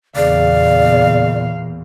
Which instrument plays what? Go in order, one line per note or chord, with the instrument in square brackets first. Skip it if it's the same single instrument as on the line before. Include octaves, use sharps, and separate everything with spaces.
[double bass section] E2 A#2 [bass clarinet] C#3 [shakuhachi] D5 [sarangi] F5